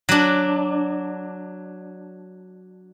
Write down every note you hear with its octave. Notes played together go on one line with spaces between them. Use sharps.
F#3 D4